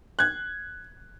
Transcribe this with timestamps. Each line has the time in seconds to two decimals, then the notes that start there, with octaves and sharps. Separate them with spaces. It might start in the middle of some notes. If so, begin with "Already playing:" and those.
0.19 F#6 G#6